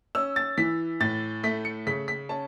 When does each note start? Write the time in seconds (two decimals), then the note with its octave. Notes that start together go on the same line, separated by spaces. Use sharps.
0.15 C#4 E6
0.36 A6
0.58 E3 B6
1.00 A2 A6
1.43 A3 B6
1.65 C#7
1.87 C#3 B6
2.08 B6
2.29 C#4 A5